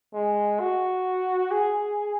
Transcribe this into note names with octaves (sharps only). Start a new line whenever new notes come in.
G#3
F#4
G#4